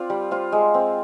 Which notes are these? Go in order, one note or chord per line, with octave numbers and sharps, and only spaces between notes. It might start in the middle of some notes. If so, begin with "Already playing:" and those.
Already playing: C4 F4 D5
G3
F4 C5
G#3
C4